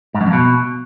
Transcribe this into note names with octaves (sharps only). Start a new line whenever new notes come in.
G#2
F#2
F2
B2